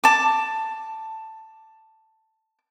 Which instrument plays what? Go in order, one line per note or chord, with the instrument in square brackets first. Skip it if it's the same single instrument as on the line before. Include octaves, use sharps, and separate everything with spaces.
[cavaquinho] A5 D6